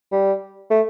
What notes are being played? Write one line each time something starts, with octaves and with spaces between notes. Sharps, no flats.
G3
A3